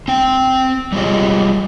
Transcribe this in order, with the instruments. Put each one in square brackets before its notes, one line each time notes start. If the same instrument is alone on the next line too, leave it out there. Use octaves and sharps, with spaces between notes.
[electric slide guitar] C4 G5
G3 G#3 F4 C#5 D#5